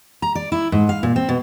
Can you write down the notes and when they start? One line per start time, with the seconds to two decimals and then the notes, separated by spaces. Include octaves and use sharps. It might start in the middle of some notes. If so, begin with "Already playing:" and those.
0.22 A#5
0.35 D5
0.52 E4
0.72 G#2
0.89 F5
1.03 A#2
1.16 C4
1.29 B2